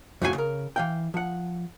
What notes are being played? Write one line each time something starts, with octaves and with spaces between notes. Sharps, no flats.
F2 A2 C#3 F#4 G4 G#5
C#3 A#4
E3 F5 G5
F3 F#5